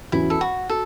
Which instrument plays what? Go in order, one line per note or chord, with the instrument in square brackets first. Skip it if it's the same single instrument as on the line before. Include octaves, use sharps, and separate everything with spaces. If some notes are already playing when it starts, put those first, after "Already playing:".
[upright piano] E2 E3 C#4 F#4 [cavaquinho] E4
[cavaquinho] A4
F#4
[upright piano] F#4 [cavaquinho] A4